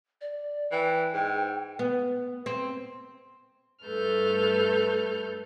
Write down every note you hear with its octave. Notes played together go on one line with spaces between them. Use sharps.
D5
E3 G5
G#2
B3
C4
G2 A3 A4 B4 F6 G6